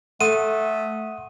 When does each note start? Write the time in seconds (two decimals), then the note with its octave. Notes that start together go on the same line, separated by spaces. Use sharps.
0.21 A3 A4 F#5 C6 D#6 D#7